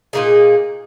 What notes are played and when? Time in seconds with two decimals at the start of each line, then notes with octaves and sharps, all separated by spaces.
0.13 A#2 A#3 D#4 G#4